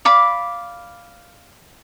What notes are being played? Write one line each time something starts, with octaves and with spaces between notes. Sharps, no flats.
D5 F5 B5